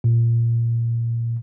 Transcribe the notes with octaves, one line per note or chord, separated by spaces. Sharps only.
A#2